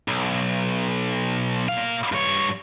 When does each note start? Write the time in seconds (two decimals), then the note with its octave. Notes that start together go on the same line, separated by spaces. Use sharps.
0.08 B1
1.69 A#2 F5
2.12 G2 C#5